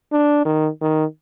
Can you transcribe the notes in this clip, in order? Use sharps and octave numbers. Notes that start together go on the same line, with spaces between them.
D4
D#3
D#3